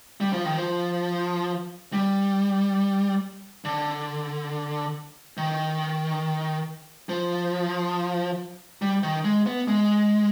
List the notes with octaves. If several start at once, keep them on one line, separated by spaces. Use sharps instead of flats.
G3
F3
D#3
F3
G3
D3
D#3
F3
G3
D#3
G#3
B3
G#3